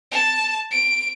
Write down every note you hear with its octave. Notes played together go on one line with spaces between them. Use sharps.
A5
D7